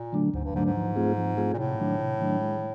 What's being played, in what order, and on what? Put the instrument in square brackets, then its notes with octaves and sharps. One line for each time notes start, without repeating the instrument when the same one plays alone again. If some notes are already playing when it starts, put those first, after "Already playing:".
Already playing: [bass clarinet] A#2
[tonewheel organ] D3 F#3 A3 D4
[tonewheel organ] D2 [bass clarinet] G#2
[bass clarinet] G2
[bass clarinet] G#2 [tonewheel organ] D3 F#3 A3 D4
[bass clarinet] G#2
[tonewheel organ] F3
A3 C4 F4 G#4
F3
A3 C4 F4 G#4
[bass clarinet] A#2
[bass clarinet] A2 [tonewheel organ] C3
[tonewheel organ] D#3 F#3 A3 D4
C3
D#3 F#3 A3 D4
G#3